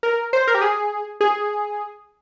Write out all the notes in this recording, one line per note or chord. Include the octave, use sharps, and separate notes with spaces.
A#4
C5
A#4
G4
G#4
G#4